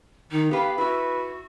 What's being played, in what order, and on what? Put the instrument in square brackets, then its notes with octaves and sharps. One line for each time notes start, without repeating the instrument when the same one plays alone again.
[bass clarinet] D#3 [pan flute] D#4
[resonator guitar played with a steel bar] B3 B4 [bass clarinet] G4 [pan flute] F5
[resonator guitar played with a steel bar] E4 [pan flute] F#4 [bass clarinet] B4